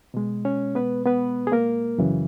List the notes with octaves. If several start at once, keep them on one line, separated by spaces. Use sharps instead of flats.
B2 G#3
C#4 C#5
B3 B4
B3 B4
G#4
A#3 A#4
F#2 C#3 E3